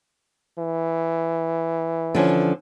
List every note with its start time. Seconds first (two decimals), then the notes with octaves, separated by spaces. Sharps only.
0.58 E3
2.15 D3 F3 C#4